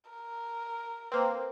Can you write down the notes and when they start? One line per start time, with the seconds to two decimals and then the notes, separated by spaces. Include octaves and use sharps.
0.11 A#4
1.12 A#3 C4 B4 C5